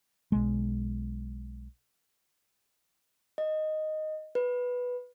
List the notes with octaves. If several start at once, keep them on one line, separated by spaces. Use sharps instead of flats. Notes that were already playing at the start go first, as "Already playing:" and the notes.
B1 G#3
D#5
B4